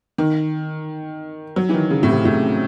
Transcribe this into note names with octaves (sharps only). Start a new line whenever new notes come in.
D#3
F#3
E3
D#3
C#3
A2
C3
A2